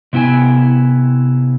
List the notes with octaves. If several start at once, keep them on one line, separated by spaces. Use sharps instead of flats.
C3 B3 E4 G5 G#5